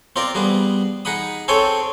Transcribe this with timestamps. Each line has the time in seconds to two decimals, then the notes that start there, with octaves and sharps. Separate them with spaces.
0.16 C4 F4 A#4 D5
0.35 G3 B3 G#4
1.05 D#4 G#4 F#5 B5 D#6
1.48 C4 G#4 A4 C#5 G5 G#5